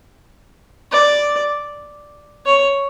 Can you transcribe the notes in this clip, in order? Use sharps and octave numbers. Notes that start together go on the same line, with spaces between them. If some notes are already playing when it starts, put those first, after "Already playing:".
D5
C#5